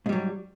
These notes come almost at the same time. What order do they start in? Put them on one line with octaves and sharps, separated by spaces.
G#2 G3 F#3